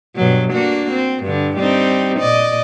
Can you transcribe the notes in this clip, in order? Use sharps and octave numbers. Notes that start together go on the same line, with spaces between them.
G2 B2 F#3
A#3 D4 F#4
C4
G2 D3
G3 C4 D#4
A#2 D5 D#5